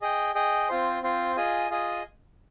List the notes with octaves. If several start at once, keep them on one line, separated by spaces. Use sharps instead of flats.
G#4 D#5 G5
G#4 D#5 G5
C4 F4 C5
C4 F4 C5
F4 G#4 D#5 G#5
F4 G#4 D#5 G#5